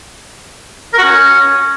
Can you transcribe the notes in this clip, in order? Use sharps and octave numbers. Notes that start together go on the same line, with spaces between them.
A#4
F#4
C#4